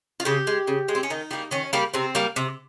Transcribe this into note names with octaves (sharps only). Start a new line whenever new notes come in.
F4
C#3 G4
G#3
C#3
G#3
C4
C#4
D#3 D#4
G3 A#3
D#3 C#4
G3 A#3
C3 C4
G3 A#3
C3